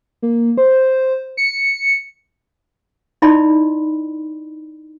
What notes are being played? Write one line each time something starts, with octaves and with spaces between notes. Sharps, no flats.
A#3
C5
C#7
D#4 E4 D5 D#5 B5 C6